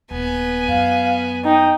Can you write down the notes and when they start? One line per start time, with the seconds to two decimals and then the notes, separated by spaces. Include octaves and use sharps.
0.11 D#1 B3 G#5
0.68 F#2 F5
1.44 D#4 G5